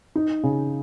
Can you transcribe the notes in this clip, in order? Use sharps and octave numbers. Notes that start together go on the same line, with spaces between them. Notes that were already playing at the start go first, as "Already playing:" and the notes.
D#4
C#3